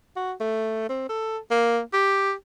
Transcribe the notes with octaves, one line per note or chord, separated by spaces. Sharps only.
F#4
A3
C4
A4
A#3
G4